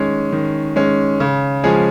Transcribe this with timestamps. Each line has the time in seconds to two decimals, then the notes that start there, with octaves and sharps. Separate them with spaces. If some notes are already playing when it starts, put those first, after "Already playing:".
Already playing: D#3 G#3 C#4
0.32 D#3
0.76 G#3 C#4
1.20 C#3
1.64 F3 G#3 C#4 G#4